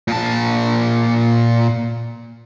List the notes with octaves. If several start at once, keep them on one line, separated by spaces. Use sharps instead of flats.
A#2 A5